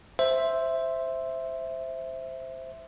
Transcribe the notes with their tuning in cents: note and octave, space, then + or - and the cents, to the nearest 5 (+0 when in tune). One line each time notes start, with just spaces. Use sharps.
C5 +0 E5 +0